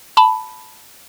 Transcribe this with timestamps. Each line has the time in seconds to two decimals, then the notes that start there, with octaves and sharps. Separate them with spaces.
0.17 A5 B5